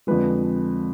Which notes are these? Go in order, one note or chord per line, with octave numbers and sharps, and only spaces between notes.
F2 D3 F3 G#3 B4